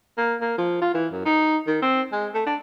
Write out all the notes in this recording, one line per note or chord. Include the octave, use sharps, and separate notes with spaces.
A#3
A#3
F3
F4
E3
F#2
D#4
D#3
C4
G#3
A3
D4